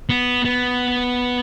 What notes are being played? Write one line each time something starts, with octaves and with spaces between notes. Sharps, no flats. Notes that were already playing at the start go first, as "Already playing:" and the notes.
B3
B3